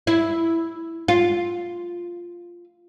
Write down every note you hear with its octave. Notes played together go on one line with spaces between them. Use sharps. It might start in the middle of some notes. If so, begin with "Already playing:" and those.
E4
F4